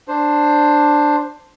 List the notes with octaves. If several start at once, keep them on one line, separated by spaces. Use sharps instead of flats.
D4 C5